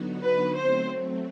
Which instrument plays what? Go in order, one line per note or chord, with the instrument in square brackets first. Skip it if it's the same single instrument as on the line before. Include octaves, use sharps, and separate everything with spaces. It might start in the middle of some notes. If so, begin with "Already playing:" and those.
Already playing: [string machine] D3 F#3 B3 D#4 F#4
[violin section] B4
[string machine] F#3 A3 C4 [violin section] C5